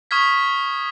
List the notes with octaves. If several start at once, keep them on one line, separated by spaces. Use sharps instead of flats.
C#6 D#6 F6 G#6 B6